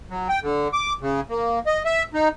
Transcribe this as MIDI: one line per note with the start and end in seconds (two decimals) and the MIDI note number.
0.10 0.28 54
0.29 0.40 79
0.42 0.68 50
0.73 0.93 86
1.01 1.20 49
1.29 1.59 58
1.67 1.82 75
1.85 2.03 76
2.14 2.29 63